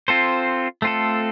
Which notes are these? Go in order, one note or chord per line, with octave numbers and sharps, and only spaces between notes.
C4 F4 A4 C5
A3 C4 F4 A4